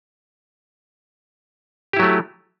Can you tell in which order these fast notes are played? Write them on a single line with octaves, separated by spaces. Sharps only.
G4 E4 F#3 A3